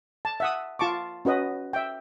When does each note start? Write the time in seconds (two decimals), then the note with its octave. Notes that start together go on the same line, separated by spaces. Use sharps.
0.25 A5
0.40 E5 F#5 D#6
0.79 F4 A5 C#6 D6
1.25 C#4 F#4 B4 D#5
1.73 E5 G5